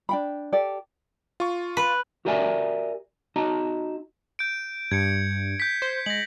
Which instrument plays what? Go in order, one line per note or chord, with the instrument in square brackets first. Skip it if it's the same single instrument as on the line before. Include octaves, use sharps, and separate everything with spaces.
[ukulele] D4 G5 B5
G4 A4 D5
[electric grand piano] F4 C#6
[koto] B4
[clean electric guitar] F#4 G4 A#4 D5 E5 G#5
D#4 F#4 D#5 A5 A#5
[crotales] G6 D7
[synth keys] G2 [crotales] G#6 C#7
[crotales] G6 B6
[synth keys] C5
[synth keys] G#3 [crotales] A#6 F#7